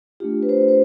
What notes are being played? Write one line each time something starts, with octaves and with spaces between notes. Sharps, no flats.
A3 D4 F4 G4
B4
C5
C5